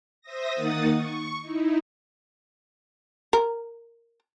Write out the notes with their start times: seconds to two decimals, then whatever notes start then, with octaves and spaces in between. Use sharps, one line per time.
0.21 C5 E5 D#6 A#6
0.53 D#3 A#3 D#4 F#5 D#6 A6
0.90 C#6
1.42 D#4 E4
3.33 A#4